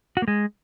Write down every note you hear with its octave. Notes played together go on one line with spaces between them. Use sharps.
F#4
A#3
G#3